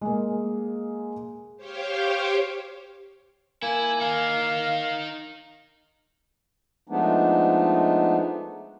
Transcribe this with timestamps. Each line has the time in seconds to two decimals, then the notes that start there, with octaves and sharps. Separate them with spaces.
0.01 G#3 A#3
1.57 G4 C5 C#5 F5 G5
3.63 A#3 E4 G#5
4.01 D#4 A#4 F5
6.89 F3 G#3 A3 B3 D4 D#4